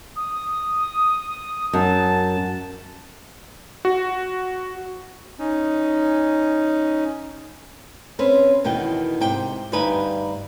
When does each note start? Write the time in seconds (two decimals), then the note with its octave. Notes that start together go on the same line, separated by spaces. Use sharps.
0.16 D#6
1.73 F#2 A5
3.85 F#4
5.39 C#4 D#4
8.19 C4 C#4 B4
8.65 E2 B2 D#3 G5
9.21 G#2 C3 G5
9.72 D2 G2 G3 D#4 B4 G#5